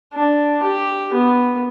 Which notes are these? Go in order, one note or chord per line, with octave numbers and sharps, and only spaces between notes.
D4
G4
B3